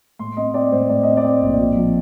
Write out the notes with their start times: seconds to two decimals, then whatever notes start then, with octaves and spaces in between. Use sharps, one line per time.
0.19 A2 C6
0.37 C4 D#5
0.54 C4 D5
0.72 A2 C5
0.89 A2 D5
1.03 C4 D#5
1.17 D5
1.24 C4
1.42 A#1
1.59 F3
1.76 F3